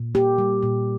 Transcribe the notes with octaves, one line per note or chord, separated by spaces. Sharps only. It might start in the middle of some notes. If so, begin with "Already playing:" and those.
Already playing: A#2
A#3 G4
G3
A#2